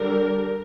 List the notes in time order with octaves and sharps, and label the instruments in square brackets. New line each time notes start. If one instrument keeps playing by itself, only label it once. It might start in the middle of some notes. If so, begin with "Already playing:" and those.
Already playing: [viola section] D3 G3 D4 A#4